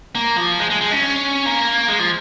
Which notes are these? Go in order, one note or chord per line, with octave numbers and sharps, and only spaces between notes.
A#3
F3
G#3
G#3
G#3
C#4
A#3
G#3
F3